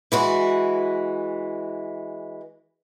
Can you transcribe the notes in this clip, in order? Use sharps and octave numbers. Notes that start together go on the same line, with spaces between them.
E3 G#3 F#4